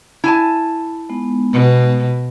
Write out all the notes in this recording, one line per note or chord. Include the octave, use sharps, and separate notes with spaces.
E4 G#5 A5
G#3 B3 D#4
B2